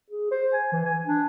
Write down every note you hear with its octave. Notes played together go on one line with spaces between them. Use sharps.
G#4
C5
G#5
E3
G#5
D4